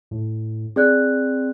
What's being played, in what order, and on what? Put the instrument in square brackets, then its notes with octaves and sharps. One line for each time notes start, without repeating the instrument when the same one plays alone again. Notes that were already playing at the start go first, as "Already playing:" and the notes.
[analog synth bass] A2
[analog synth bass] C4 [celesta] G#4 D5 F#6